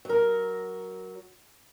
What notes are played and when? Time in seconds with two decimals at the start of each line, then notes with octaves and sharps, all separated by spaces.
0.05 F#3 A#4